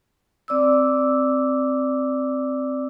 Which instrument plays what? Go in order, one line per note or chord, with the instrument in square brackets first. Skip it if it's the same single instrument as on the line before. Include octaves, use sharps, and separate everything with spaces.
[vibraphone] C4 D5 D6 E6